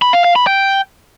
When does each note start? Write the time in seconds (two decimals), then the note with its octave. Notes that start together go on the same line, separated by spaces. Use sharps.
0.02 B5
0.13 F5
0.24 F5
0.36 B5
0.47 G5